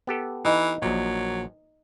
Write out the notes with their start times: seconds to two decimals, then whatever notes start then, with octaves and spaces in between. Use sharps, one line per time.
0.07 B3 G4 A4
0.45 E3 D#4
0.82 A#1 A#2 F#3